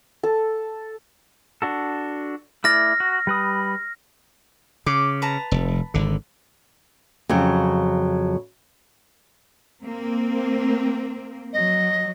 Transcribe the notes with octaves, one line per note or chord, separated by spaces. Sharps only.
A4
D4 F#4 A4
A3 E4 D5 F6 A#6
F#4
G3 B4 D#6
C#3 D6
B4 A5 A#5
F1
G#1 D3
F2 C#3 F#3
A#3 C4
F#3 D#5